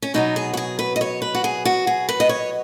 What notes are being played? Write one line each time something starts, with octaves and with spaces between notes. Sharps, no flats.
C#4
B2 F#3 B3 D#4
G#4
F#4
G#4
B4
D#5
C#5
B4
F#4
G#4
F#4
G#4
B4
D#5
C#5